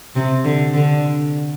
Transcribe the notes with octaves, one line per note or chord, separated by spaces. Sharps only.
C3
D3
D3